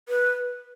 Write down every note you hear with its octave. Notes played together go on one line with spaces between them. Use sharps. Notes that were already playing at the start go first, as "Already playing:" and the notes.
B4